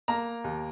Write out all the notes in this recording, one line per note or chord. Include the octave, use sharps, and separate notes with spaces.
A#3 A#5
D#2